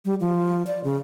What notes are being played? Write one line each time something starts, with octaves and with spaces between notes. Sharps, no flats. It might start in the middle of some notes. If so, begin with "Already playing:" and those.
G3
F3
D5
C#3